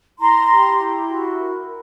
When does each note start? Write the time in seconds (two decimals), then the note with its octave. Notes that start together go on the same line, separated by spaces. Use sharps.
0.20 E4 A#5 C6
0.50 G4
0.79 E4
1.08 F#4
1.38 A#4
1.67 A#4